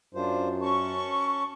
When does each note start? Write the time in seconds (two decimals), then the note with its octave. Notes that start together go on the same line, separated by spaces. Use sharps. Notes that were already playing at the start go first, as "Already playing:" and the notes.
0.15 F#2 D4 F4 C5
0.62 C#4 A5 C#6